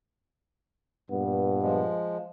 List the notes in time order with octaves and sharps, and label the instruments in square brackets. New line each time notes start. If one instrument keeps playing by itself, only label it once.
[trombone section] G2 A#2 B3
[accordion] F3 G#3